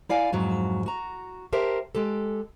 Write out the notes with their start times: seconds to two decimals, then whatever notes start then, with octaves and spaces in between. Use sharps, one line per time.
0.09 E4 D5 F5 G#5
0.33 F2 G#2 F#3
0.86 F#4 A#5
1.53 G4 A#4 C5 E5 A5
1.95 G#3 G4 A4